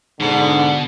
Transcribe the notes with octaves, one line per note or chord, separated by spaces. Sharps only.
G#2 B2 D3